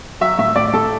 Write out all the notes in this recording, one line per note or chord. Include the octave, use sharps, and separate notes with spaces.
F#3 E5
A2 E5
A2 D5
A2 A4